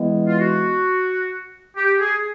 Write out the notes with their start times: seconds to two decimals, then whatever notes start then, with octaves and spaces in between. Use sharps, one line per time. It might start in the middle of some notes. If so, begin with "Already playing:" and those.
Already playing: E3 G#3 B3
0.27 F4
0.39 F#4
1.76 G4
1.99 G#4